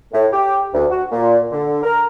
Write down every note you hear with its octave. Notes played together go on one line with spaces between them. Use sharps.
A2
G4
D2
F#4
A#2
D3
A#4